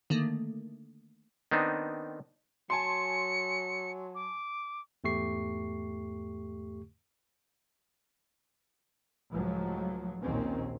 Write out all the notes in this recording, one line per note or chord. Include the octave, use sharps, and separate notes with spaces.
D3 D#3 A3 A#3
D#3 B3 C4 D4 D#4
F#3 G#5 A5 C6 C#7
D6
E2 G#2 A3 G4 C#6 C7
C#2 A2 F3 F#3
A#1 D#2 A#2 D#3 C4 C#4